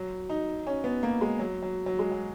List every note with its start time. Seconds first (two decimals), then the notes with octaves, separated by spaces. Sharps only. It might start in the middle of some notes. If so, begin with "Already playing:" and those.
Already playing: F#3
0.29 D#4
0.67 C#4
0.84 B3
1.03 A#3
1.21 G#3
1.39 F#3
1.62 F#3
1.86 F#3
1.99 G#3
2.11 F#3